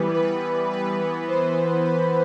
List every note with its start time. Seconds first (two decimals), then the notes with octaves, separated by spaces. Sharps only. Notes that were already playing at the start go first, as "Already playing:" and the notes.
Already playing: E3 G3 B3 B4
0.14 B4
0.70 B4
0.99 E3 B3
1.28 C5
1.85 B5